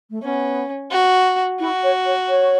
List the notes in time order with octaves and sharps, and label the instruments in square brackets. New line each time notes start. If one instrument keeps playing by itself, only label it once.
[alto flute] A3
[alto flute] B3 [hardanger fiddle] C#4
[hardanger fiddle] F#4
[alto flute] E4 [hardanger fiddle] F#4
[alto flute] C#5
C#5
C#5